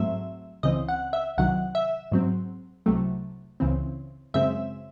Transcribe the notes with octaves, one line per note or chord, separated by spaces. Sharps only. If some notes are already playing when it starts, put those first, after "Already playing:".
Already playing: G#2 F#3 A3 C4 E5
C#2 C#3 E3 C4 D#5
F#5
E5
C2 C3 D#3 F#3 F#5
E5
G#2 F#3 C4
C2 C3 F#3 A3
C#2 C#3 E3 C4
F#2 C#3 G#3 C4 E5